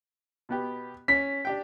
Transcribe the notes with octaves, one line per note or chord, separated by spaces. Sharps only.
B2 B3 G4
C#4 B6
D4 G4 G5